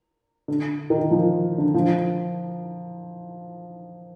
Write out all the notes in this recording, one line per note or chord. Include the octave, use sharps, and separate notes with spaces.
D3
D#3
F3
D3
F3